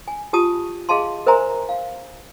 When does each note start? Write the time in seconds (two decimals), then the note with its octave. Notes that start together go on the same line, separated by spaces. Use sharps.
0.08 G#5
0.33 F4 G4 A5 D#6
0.89 G#4 D#5 F5 A5 C6
1.26 A#4 C5 E5 G#5 A#5 C6
1.69 F5